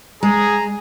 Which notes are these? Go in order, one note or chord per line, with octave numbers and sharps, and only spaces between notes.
G#3 G#4 A#5